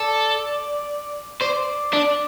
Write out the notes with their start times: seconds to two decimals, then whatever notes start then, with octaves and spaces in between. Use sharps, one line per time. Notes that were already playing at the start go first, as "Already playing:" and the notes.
Already playing: A4 D5
1.41 C5 D5
1.93 D4